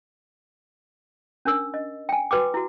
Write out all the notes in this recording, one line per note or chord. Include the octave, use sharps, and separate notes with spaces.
C#4 D4 A#4 E6
D#5
G5 G#5
F#4 B4 G5 D6
E4 F#4